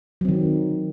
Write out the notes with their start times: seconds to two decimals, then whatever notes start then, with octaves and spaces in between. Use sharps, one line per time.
0.21 F#3
0.25 C4
0.29 D#3